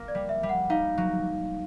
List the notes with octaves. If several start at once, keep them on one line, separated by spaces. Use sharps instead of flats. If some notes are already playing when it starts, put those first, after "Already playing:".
Already playing: A#3
D5
G3
E5
G3
F#5
D#4 F5
F#3